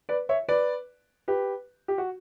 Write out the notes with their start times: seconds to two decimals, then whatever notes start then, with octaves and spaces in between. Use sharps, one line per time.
0.09 B4 D5
0.29 C#5 E5
0.49 B4 D5
1.28 G4 B4
1.88 G4
1.98 F#4